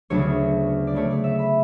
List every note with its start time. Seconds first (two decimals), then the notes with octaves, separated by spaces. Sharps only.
0.10 D2 C#3 F#3 B3 D4 C#5
0.87 D5
0.94 C#3 F#3 A3 D4 C#5
1.10 D5
1.24 E5
1.39 B5